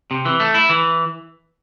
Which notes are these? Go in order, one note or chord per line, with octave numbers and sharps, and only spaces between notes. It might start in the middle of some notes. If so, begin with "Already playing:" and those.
C3
E3
A3
E4
E3